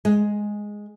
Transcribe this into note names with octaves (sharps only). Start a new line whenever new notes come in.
G#3